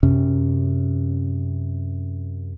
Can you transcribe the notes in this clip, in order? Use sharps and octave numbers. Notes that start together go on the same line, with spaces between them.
F#2 C3 C#4